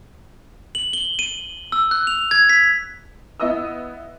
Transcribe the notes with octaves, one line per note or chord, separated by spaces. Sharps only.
F#7
G7
D#7
E6
F#6
F7
G#6
B6
B3 E4 D#5 D#6 E6